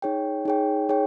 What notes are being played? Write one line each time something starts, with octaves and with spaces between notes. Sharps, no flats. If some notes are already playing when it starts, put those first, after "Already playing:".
D#4 G#4 C#5 G5
D#4 G#4 C#5 G5
D#4 G#4 C#5 G5